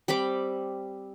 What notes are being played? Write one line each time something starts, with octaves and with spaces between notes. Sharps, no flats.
G3 C4 B5 D6